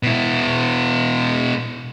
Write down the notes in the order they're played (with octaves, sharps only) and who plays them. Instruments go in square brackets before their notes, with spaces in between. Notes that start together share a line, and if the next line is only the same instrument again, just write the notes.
[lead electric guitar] B2 E4